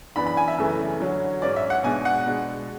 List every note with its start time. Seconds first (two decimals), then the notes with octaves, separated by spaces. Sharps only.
0.16 F#2 E3 B3 D4 B5
0.27 B5
0.37 G#5
0.48 E5
0.58 F#2 C#3 E3 A3
1.00 D3 F#3 C#4
1.42 G#2 G#3 C#4 D5
1.56 E5
1.70 F#5
1.84 B2 G#3 D4 G#5
2.05 F#5
2.26 B2 G#3 D4